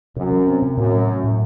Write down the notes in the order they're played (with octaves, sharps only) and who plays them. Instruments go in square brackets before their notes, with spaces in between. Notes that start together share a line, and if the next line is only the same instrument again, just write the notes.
[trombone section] F#2 [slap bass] C3
[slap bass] F#3
C4
C3
[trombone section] F#2 [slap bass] A2
[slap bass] F#3
A3
A2